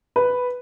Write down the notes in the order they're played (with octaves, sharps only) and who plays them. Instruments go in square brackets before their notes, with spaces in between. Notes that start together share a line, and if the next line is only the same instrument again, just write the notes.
[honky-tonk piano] B4